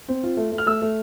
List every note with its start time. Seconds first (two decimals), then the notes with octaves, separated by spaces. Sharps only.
0.08 C4
0.23 F4
0.37 A3
0.52 A3
0.58 F6
0.66 A3 E6
0.82 A3